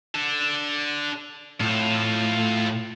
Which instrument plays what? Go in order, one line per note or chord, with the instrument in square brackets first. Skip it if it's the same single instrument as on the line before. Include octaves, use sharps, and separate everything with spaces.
[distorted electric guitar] D4 A4
[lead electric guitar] A2 [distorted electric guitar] F4 A4